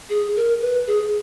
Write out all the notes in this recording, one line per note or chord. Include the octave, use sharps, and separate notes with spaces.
G#4
A#4
B4
G#4